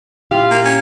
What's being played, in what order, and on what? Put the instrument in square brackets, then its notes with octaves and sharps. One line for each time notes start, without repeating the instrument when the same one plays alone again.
[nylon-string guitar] A#2 E4 G4 [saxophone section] F4 F5
[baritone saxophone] A#3
C#4